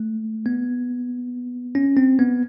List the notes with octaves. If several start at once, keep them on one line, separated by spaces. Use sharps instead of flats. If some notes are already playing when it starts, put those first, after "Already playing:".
Already playing: A3
B3
C#4
C4
B3